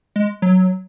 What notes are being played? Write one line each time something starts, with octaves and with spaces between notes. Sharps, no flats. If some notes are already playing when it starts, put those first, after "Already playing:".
G#3
F#3